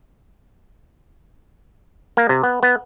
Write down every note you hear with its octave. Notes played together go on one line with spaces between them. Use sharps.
A#3
C3
B3
B3